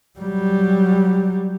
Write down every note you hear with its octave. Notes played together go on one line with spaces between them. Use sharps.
F#3 G3